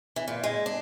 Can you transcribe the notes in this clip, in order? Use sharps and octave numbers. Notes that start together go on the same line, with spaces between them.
E3
A#2
G#3
D4